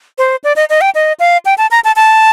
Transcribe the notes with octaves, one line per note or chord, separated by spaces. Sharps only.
C5
D5
D#5
D#5
G5
D#5
F5
G5
A5
A#5
A5
A5